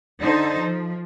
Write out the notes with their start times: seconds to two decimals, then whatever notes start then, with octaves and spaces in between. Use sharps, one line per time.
0.21 D3 D#4 A4 C5
0.58 F3